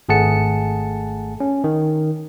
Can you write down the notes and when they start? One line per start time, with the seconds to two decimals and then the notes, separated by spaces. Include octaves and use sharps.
0.09 G#1 A3 G#4 F#5 A5 C#7
1.40 C#4
1.64 D#3